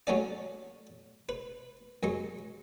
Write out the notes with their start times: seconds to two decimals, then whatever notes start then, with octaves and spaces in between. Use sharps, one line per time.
0.07 F#3 A3 C#4 D5
1.29 B4
2.03 F#2 G#3 C#6